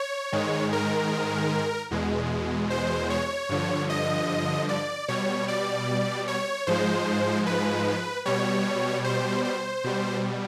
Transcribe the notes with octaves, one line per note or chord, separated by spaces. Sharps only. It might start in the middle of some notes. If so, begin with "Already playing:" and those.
Already playing: C#5
G#2 D#3 G#3
A#4
E2 B2 G#3
C5
C#5
G2 D3 F3
D#5
D5
B2 G3 C#5
D5
C#5
G#2 F3 G#3 C5
B4
B2 G3 C#5
C5
C5
B2 G3